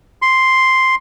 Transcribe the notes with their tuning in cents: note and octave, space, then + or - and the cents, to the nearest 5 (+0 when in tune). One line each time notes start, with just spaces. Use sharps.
C6 +0